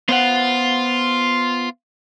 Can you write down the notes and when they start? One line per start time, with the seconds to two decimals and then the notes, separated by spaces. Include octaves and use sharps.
0.09 B3 F4 C5 F#5